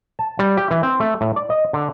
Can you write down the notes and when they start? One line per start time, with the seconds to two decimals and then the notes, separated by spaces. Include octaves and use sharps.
0.19 A5
0.39 G3
0.57 G4
0.71 E3
0.83 C4
1.00 A3
1.21 A2
1.36 D5
1.50 D#5
1.73 D3